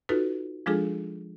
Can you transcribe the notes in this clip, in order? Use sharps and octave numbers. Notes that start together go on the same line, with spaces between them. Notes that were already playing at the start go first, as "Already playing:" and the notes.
D#4 F4 F#4 A4 B4
F3 G#3 D4 F4 G#4 A4